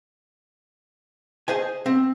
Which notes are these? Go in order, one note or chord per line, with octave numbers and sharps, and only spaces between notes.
G#4 C5 D#5 G#5
C4